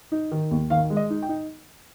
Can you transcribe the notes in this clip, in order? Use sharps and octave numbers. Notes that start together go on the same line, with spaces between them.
D#4
D#3
D#2
D#3 F5
G#3
D#5
D#4
G5
D#4